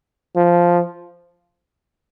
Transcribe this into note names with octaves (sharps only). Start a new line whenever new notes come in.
F3